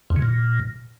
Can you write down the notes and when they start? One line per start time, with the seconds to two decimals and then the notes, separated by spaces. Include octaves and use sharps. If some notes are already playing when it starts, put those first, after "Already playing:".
0.10 F2
0.16 C#3
0.22 A#2